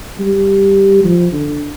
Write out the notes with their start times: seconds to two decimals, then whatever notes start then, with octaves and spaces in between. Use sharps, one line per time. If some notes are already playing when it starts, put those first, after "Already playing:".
0.20 G3
1.04 F3
1.32 D3